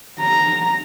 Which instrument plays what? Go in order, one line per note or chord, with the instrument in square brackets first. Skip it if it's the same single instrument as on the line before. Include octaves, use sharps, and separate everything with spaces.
[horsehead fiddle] A#5